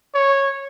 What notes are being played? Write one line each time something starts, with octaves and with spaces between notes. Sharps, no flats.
C#5